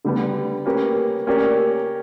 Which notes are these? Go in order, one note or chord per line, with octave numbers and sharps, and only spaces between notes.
D3 G3 B3
A#3 C#4 G4 B4
A#3 C#4 G4 A#4 D5